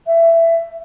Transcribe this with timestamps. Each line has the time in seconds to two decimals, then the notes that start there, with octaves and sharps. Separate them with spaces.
0.06 E5